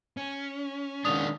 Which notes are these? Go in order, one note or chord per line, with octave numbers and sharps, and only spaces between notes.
C#4
D#3 G#3 D4 D#6 F7